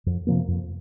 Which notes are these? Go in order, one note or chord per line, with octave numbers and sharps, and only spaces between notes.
F2
C3 F3 A#3
F2